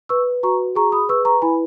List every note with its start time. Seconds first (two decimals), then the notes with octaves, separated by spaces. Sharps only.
0.09 B4 C#6 E6
0.43 F#4 A#5 C#6
0.75 G#4 A#5 C#6
0.92 B5 D#6
1.09 B4 C#6 E6
1.25 A#5 C#6
1.42 E4 G#5 B5